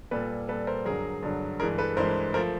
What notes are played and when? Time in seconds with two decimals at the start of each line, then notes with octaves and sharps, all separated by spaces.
0.11 A#2 G3 A4 B4
0.48 A#2 G3 A4 B4
0.67 A#4 C5
0.85 G2 D3 F#3 G#4 A#4
1.23 G2 D3 F#3
1.60 G2 E3 G#3 G#4 A#4
1.78 A4 B4
1.97 G2 E3 G#3 A#4 C5
2.34 F3 A3 A#4 C5